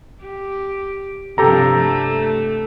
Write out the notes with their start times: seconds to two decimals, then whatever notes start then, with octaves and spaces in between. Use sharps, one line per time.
0.22 G4
1.38 G2 C3 F3 G4 A4 A#5
1.77 A3